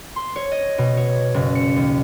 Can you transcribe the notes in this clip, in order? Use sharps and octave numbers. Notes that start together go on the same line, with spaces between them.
C6
C#5
D#5
B2
C#5
F#1
C#7
D#2